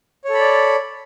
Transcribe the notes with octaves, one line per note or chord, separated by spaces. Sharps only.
A4 C#5 D5 B5